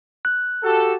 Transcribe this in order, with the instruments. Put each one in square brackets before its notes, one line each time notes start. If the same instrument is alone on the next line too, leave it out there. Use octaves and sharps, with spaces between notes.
[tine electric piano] F#6
[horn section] F#4 G4 A4